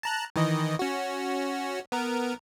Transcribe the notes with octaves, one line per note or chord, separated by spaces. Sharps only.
A5 A#5 F#6
D#3 E3 D#5
C#4 F#4
B3 A#4